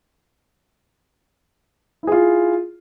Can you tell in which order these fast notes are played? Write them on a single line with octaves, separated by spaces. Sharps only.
E4 G#4 F4